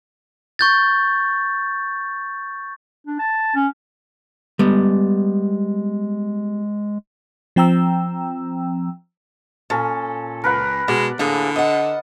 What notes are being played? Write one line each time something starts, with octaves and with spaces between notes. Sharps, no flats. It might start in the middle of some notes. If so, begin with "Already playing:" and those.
C#6 G6 A6
D4
A5
C#4
G3 G#3 B3
F3 C4 G5 A#5 E6
A#2 C#4 A4
C#2 A#4 B4 F#5
B2 G#3 D5
A2 D3 A#3 G#4
D#5 F#5